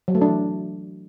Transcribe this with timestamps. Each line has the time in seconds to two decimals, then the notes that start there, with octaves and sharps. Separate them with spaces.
0.08 F#3
0.15 A3
0.21 D4
0.28 E3